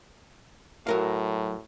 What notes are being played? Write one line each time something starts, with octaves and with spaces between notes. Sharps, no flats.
A2 F#3 A#4 F5